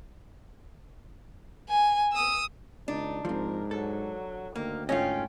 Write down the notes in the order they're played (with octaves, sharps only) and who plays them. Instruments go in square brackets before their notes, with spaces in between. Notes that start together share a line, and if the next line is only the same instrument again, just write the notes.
[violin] G#5
D#6 E6
[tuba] C#2 [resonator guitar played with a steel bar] D4 [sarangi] D#4
[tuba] G#2 [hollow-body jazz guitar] F3 C4 [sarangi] A#4
[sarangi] F#3 [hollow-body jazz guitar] A4
[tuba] D2 [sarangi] D#3 [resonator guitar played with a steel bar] A#3
[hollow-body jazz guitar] G#2 A3 D#5 [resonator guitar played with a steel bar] C#4 F4 [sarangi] G5